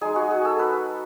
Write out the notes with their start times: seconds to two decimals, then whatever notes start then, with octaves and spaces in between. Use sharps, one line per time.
0.01 G#3 D#4 G#4
0.16 F#4
0.31 G#4
0.45 A4
0.59 B4